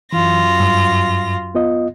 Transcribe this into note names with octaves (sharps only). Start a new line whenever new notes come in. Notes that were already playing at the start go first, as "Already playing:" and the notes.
F#2 E3 F4 A#6
G2
B3 F4 D#5